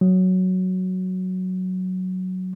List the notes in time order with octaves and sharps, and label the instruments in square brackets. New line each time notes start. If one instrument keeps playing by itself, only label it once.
[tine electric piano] F#3